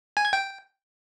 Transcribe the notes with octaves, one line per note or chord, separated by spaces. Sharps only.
G#5
G#6
G5